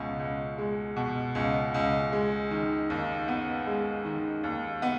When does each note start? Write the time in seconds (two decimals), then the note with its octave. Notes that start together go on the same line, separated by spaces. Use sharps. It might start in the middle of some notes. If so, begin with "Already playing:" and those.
Already playing: C#2 B2
0.19 C#2
0.58 G#3
0.96 B2
1.35 C#2
1.74 C#2
2.13 G#3
2.51 D#3
2.90 D#2
3.28 B3
3.67 G#3
4.05 D#3
4.44 D#2
4.82 B3